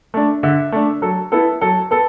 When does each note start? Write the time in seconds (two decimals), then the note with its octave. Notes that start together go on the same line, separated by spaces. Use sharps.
0.14 A3 D4
0.43 D3 E5
0.72 A3 D4
1.02 F#3 A4
1.32 B3 E4 A4
1.61 F#3 A4
1.91 B3 A4